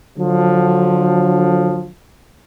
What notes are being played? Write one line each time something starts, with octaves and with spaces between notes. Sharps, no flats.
D3 F3 F#3